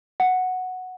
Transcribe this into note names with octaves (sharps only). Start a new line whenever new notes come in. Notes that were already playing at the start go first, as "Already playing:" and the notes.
F#5